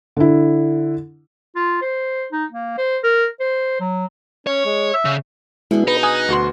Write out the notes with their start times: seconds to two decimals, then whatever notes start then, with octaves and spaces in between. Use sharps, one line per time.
0.17 D3 E4
1.56 F4
1.82 C5
2.32 D#4
2.52 A#3
2.78 C5
3.04 A#4
3.40 C5
3.80 F#3
4.47 C#4 C#5
4.65 G#3
4.94 E5
5.05 C#3
5.71 B2 G#3 D4 E4 G#4
5.88 D#4 B4
6.03 G#5 D#6 F#6
6.28 D2 F#4 C6